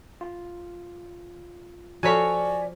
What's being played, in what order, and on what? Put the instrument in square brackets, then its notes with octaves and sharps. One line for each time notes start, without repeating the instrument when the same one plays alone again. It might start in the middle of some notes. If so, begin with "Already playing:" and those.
[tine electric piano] F4
[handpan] F3 F5 [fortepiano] F#4 A4 C#5 [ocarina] D5 [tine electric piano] G#5 B6